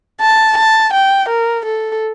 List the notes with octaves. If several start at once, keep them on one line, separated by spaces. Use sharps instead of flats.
A5
A5
G5
A#4
A4